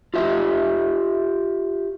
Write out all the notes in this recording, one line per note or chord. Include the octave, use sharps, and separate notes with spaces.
F4 G4 C5 E5